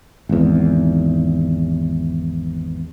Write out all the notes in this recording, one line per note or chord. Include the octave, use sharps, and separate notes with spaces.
G#1 E2